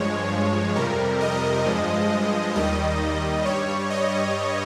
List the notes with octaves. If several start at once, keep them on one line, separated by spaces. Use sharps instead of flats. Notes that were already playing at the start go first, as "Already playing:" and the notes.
Already playing: G2 F3 G#3 C#5
F2 C3 G3 A#4
D#5
G2 F3 G#3
D#2 D#3 G3 D#5
G2 G3 C#5
D#5